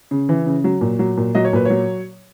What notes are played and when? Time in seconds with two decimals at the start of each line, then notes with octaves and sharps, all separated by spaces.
0.11 C#3
0.29 E3
0.46 C#3
0.64 F#3
0.81 A#2
0.99 F#3
1.17 A#2
1.35 F#3 D#5
1.45 C#5
1.53 A#2 B4
1.65 F#3 C#5